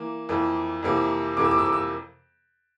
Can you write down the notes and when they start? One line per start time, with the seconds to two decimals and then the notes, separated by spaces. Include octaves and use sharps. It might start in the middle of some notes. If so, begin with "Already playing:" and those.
Already playing: E3 A#3
0.29 F2 E3 A#3
0.83 F2 C3 E3 A#3
1.37 F2 C3 E3 A#3 D6
1.45 E6
1.51 D6
1.58 E6
1.66 D6
1.73 E6